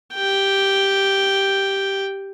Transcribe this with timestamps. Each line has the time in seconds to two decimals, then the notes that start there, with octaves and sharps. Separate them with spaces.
0.14 G4 G5